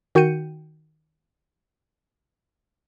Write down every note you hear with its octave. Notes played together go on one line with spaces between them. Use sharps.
D#3 F#4 G5 G6 C#7 D#7